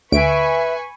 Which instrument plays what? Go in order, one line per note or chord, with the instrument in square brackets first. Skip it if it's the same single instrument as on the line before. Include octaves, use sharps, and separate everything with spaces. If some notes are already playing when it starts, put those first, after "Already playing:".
[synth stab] D2 D7 [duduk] B4 [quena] E5 [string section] G#5 B5 C#6